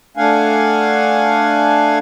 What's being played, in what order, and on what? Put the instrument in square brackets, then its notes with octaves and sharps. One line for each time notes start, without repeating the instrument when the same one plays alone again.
[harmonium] A3 D4 F5 F#5 G#5